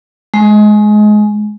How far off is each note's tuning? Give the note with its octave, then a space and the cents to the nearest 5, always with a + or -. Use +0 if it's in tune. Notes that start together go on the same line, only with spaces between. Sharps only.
G#3 +20